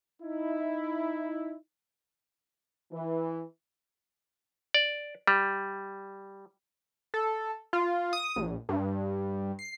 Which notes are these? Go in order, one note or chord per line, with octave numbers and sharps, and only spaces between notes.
D#4 E4
E3
D5
G3
A4
F4
D#6
A#1
G2
C7